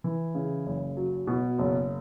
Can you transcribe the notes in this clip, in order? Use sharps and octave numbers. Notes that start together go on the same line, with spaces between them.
E3
C#3
F#1
F#3
B2
F#1